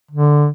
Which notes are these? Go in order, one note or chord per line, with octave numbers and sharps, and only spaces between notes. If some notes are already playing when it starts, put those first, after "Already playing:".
D3